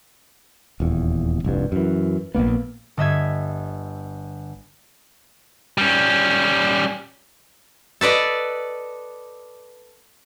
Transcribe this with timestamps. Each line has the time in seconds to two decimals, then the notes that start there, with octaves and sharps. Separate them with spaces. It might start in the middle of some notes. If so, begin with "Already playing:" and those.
0.80 D#1 E2
1.44 F1 C2 G2
1.72 F#2 E3
2.35 A#1 G2 A#3 B3
2.97 G1 D#5 E5 G#6
5.78 G3 C#4
8.01 A4 B4 D5 D#5